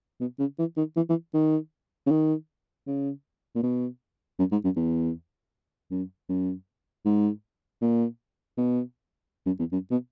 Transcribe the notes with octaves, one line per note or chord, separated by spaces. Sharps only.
B2
C#3
E3
D#3
E3
E3
D#3
C#3
D#3
C#3
A#2
B2
F#2
G#2
F#2
E2
F#2
F#2
G#2
A#2
B2
F#2
E2
F#2
B2